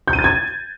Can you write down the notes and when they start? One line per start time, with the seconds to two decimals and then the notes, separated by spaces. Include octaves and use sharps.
0.08 G6
0.13 D#7
0.19 A6
0.24 G#6